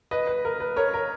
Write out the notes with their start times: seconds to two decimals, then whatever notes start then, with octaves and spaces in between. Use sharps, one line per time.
0.11 B4 D#5
0.27 B4
0.45 A#4
0.60 B4
0.76 A#4 C#5
0.94 A#4